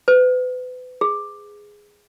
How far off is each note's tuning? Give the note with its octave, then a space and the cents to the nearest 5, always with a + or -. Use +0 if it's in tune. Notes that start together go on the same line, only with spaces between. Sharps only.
B4 +35
G#4 -5